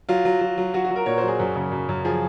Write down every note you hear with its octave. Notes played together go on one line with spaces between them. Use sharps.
F#3 F4
F#3
F#3
F#3
F#3 F#4
F#4
F#3
A#4
A#2 C#5
C5
F#3 G#4
F#2
C#3
F#2
F#2
F3 G#4